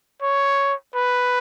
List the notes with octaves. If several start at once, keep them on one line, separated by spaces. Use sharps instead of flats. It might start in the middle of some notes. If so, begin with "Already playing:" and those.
C#5
B4